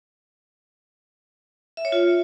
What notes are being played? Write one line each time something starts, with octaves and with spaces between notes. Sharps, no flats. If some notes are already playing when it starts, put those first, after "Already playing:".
E5
C#5
F4